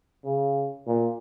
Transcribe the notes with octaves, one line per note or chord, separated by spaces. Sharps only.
C#3
A#2